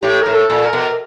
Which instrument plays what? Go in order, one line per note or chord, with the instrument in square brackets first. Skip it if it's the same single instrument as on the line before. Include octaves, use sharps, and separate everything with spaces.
[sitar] A2 [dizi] G4
[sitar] A2 [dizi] A#4
[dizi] A4
[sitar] A#2
[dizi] A#4
[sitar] B2